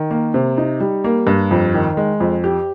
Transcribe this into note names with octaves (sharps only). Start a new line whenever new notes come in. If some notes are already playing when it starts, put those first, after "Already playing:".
Already playing: D#3
A#3
C3
D#4
G3
A#3
G2
F2
D#3
G#3
F2
G4